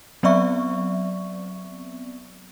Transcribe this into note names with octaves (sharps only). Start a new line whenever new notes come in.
F#3 B3 C4 D5 E5 C#6